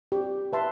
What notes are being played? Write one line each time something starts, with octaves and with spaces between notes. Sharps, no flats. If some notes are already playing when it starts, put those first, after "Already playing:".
G4
B4 E5 A5 C6